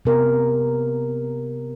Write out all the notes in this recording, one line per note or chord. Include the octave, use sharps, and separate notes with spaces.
C3 B3 A#4